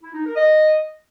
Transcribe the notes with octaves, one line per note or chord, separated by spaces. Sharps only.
E4
D#4
A#4
D#5